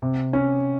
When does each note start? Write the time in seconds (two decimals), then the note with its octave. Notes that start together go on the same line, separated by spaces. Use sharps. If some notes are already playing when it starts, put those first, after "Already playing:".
0.02 C3
0.33 C#4